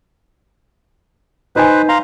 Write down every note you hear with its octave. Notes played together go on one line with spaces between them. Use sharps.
D#4 B4 C5 G#5
F5 A#5 C6